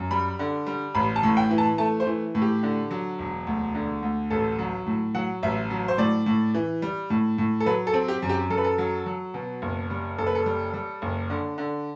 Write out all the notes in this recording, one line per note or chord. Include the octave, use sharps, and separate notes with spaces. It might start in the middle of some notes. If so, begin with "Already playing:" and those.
Already playing: F#2
G3 B5
D3
G3
A1 B5
A5
A2
G5
E3
A5
A3 A5
C5
E3
A2
G4
D3
F#3
E1
D2
D3
D2
A1 A4
F#3
A2
F#3 F#5
A1 E5
F#3
C5
A2 D5
A2
E3
G3
A2
A2
A4
F#3 B4
A4
C4
G4
F#2
G4
F#2 A4
B4
A4
F#3
F#3
B2
F#1
G3
F#1 A4
B4
A4
G3
G3
F#1
D3
D3